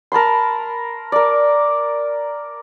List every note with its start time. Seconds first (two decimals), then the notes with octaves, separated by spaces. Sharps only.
0.12 A#4 A5 B5 C6
1.12 A#4 D5